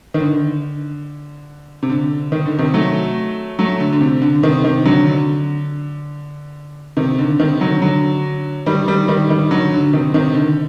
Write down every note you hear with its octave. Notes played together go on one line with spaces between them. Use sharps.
D#3
D3
C3
D3
D#3
D3
C3 D#3
F#3 A3
F#3 A3
D3
D3
C3
D3
C3 D#3
C3 D#3
D3 F#3
D3
C3 D#3
D3
C3 D#3
D3 F#3
D3 F#3
D#3 G3
D#3 G3
D#3 G3
D#3 G3
D3 F#3
D3
C3 D#3
C3 D#3
D3